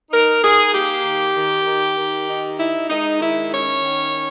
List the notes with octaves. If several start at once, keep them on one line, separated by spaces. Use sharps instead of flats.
D#4 A#4
D#4 G#4
A#3 G4
D#3
D#3
D#3
D#3
D#4
D#4 E4
G#3 D#4
D#3 E4
C#4 C#5
D#3
C#4